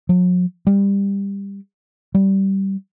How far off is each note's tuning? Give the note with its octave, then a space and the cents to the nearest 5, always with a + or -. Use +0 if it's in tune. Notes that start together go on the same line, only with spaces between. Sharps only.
F#3 -45
G3 +20
G3 -15